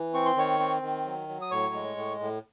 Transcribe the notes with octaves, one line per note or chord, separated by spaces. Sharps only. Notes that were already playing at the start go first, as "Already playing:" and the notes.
Already playing: E3
C4 C#6
C6
D#3 C#5 C#6
C4
D#3
F#3
F#3
D#6
A2 C#5 C#6
G#3
A2
A2